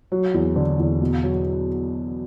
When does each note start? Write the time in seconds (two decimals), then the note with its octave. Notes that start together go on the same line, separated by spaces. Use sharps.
0.12 F#3
0.34 E2
0.56 D3
0.79 E2
1.01 B2
1.23 F#3